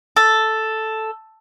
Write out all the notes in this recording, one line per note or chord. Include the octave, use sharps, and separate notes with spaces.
A4